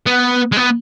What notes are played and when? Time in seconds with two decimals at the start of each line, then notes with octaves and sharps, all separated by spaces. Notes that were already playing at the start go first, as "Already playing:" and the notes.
0.06 B3
0.52 G#3
0.57 B3